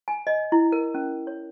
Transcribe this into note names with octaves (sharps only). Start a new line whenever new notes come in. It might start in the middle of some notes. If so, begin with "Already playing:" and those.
G#5
D#5
E4
A#4
C#4
C#5